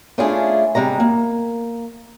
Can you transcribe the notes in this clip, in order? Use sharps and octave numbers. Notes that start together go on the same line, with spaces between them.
A3 C#4 D4 E4 F4 G#4
C3 G3 G#3 A#5
A#3